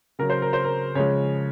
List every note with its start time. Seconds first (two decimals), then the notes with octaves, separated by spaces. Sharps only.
0.19 C#3 F#3 A#4
0.30 C5
0.42 A#4
0.53 C5
0.64 A#4
0.95 C#3 F3 G#3 C#5